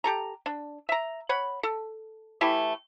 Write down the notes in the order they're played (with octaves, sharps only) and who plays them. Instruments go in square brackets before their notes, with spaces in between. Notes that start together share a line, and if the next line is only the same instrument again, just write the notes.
[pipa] G4 A4 A#5
D4
E5 A#5
C#5 F#5 B5
A4
E3 A3 E4 G4